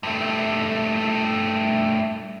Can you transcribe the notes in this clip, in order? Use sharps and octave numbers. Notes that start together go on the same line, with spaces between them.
G2 A3